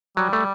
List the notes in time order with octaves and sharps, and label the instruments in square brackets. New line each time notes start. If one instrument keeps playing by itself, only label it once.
[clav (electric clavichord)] F#3 [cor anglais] G3
[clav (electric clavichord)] A3